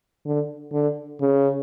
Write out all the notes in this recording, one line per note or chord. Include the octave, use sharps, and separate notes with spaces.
D3
D3
C#3